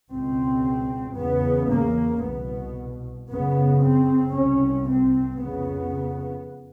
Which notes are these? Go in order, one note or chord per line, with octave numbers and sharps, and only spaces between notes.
C#2 B2 C4
E2 C#3 B3
A#3
C2 B2 B3
F#2 C#3 B3
C4
C2 C3 C#4
C4
F2 C#3 B3